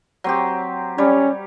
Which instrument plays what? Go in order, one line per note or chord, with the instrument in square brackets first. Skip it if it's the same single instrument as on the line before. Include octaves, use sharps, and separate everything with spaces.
[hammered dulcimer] F#3 C4 G4
[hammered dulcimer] G3 C#5 [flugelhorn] C#4